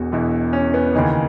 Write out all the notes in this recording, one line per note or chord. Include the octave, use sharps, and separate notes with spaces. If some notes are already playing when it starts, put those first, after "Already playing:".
Already playing: E1 E2 B2 F#4
E1 E2 B2 E4
C#4
B3
D#2 C#3 E3 D#4